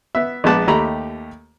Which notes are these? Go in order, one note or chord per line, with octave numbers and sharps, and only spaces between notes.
B3 E5
A#1 G#3 B3 A5 D6 F#6
D#2 A3 G4 G5 A#5 B5